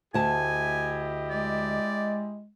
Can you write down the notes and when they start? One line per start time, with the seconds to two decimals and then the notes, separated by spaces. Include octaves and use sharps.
0.14 D2 E4 G4 D#5 G#5 A5
1.30 G#3 D5